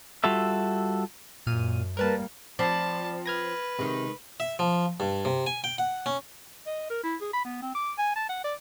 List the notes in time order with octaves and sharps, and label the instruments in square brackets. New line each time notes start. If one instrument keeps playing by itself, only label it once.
[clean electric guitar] G3 F4 F#4 A4 E5
[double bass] F#2 [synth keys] A#2 F6 D#7
[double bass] G3 A#3 [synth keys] A#4 B4 A5
[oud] F3 C4 [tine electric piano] D5 B5 [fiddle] A5
[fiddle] B4 [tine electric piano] F6 G#6 A#6
[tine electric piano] C3 [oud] D#3 G#3
[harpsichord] E5
F3
G2
C3
G#5
G5
F#5
C#4
[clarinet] D#5
A#4
E4
G#4
B5
B3
C4
D6
G#5
A5
F#5
D5